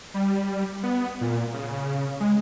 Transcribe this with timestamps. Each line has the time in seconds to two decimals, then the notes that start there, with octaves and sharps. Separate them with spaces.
0.14 G3
0.83 B3
1.21 A#2
1.54 C#3
2.20 G#3